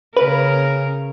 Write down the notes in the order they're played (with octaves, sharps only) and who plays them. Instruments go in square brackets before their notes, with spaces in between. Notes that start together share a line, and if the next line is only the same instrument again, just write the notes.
[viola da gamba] C#3 C#4 A#4 [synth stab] B4